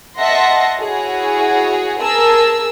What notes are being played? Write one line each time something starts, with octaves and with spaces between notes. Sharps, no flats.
D#5 E5 F#5 A5 C6 A#6
E4 F#4 G#4 C#5
G#4 A#4 A5 E6